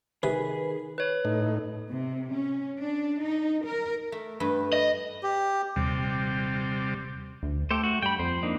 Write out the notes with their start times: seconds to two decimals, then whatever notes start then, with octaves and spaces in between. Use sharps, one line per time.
0.23 C3 D#3 G#4 B4
0.98 B4 C#5
1.25 A2 D#4
1.90 C3
2.32 C#4
2.80 D4
3.21 D#4
3.66 A#4
4.12 A3
4.40 G2 A3 B4
4.73 D#5
5.23 G4
5.76 D#1 D#2 C3 G3
7.43 D2
7.71 A3 G4 A4 C5
7.84 F#4
8.02 G2 G5 B5
8.19 F2 C5
8.43 A#3 D4 D#4